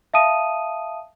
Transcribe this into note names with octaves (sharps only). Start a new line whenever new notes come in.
E5 F5 A5 D#6 D#7